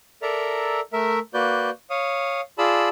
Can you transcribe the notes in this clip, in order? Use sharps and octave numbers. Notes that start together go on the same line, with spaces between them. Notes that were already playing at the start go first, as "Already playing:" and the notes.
A4 A#4 D5 E5 A#5
A3 A#4 E5
A#3 F#4 B4 D5 G6
C#5 F5 D#6
F4 G#4 D5 A5 B5 E6